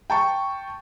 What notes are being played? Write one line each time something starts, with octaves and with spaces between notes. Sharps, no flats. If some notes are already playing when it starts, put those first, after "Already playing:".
G5 A5 C#6